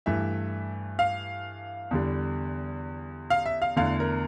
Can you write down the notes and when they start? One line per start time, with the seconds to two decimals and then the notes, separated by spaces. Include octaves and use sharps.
0.06 G2 E3 A3 E5
0.99 F5
1.91 E2 D3 G3
3.30 F5
3.46 E5
3.62 F5
3.76 E2 D3 A3 F5
4.00 A#4